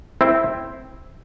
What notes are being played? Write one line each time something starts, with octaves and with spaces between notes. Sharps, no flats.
C4 E4